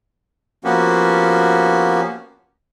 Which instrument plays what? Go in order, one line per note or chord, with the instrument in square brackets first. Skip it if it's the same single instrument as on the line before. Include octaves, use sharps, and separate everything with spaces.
[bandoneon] F3 A#3 B3 C#4 F#4 G4